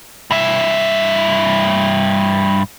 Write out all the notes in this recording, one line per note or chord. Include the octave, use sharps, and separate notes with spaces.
G2 E5